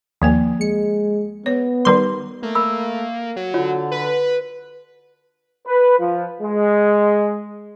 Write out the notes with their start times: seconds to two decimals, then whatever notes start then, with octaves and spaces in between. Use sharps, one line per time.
0.22 D#2 F3 A#3 G#5
0.61 G#3 C#7
1.46 B3 C#5
1.85 D#3 G3 A#4 B4 C6
2.43 A3 A#3
2.55 A#4 B5 E6
3.36 F#3
3.54 D3 F4 C#5
3.91 B4
5.67 B4
5.99 F3
6.42 G#3